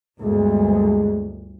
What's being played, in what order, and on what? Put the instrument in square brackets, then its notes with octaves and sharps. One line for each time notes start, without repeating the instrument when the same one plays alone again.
[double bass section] G1 D2 [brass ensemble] G#3